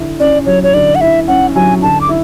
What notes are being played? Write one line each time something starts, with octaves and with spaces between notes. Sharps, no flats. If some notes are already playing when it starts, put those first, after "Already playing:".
Already playing: D3 E4
C#4 D5
F#3 C#5
C#5
D3 D5
F#5
E4 E5
C#4 F#5
F#3 G#5
D3 A5
D6
E4